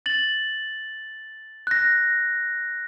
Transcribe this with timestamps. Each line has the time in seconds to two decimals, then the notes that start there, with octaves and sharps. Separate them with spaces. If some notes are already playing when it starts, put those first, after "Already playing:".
0.06 A6 F#7
1.67 F#6 A#6